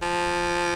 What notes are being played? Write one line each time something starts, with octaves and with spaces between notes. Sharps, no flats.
F3